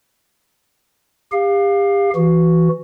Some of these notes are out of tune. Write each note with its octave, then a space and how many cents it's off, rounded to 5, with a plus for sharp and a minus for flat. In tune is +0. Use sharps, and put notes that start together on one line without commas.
G4 +35 F5 +10
E3 +15 F#4 +0